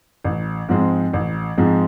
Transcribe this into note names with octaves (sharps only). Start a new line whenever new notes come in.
A1
G#2 F3 G#3 C4
A1
G#2 F3 G#3 C4